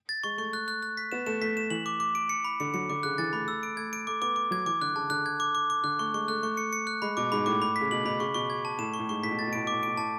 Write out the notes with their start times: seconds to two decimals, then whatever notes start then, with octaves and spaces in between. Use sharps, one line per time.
0.09 A6
0.24 G#3 C#6
0.38 A3 C#6
0.53 F#6
0.68 F#6
0.83 F#6
0.97 B6
1.12 B3 E7
1.26 A3 E7
1.42 A3 B6
1.57 E7
1.70 E3 F#7
1.86 D6
2.00 D6
2.15 D7
2.29 C#7
2.45 B5
2.60 D3 C#7
2.74 F#3 C#7
2.90 D3 D6
3.03 C#3 F#6
3.18 E3 A6
3.33 A3 B5
3.48 E6
3.63 D7
3.77 A3 G#6
3.93 D7
4.07 A3 D6
4.22 B3 D6
4.36 D6
4.51 F#3 G#6
4.66 E3 D6
4.81 D3 F#6
4.95 C#3 A5
5.10 D3 F#6
5.26 G#6
5.40 D6
5.55 D6
5.70 D6
5.84 D3 F#6
5.99 A3 C#6
6.14 G#3 C#6
6.28 A3 F#6
6.43 A3 C#6
6.57 C#7
6.73 C#7
6.87 F#6
7.02 G#3 B5
7.17 B2 D6
7.32 G#2 B5
7.46 A2 D6
7.62 B5
7.76 B6
7.81 C#3
7.91 B2 F#7
8.05 B2 B5
8.20 C#3 C#6
8.34 B2 C#6
8.50 G#6
8.65 A5
8.79 A2 E7
8.93 C#6
8.99 A2
9.09 G#2 C#6
9.23 A2 B6
9.31 B2
9.39 A2 A6
9.47 B2
9.53 A2 D7
9.64 B2
9.67 A2 D6
9.83 B2 D7
9.98 A2 A5